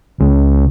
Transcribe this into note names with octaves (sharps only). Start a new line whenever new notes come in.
C#2